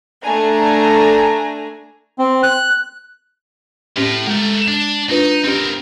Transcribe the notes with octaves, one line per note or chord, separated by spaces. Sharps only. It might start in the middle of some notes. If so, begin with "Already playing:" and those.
A3 D4 G#5 A#5
C4
F#6
A2 C4 C#4 G4
G#3 A3 A#4
D4
D4 D#4 F4 B4
C4 C#4 G4 A#4